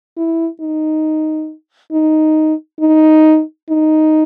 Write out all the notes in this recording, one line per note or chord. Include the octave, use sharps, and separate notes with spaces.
E4
D#4
D#4
D#4
D#4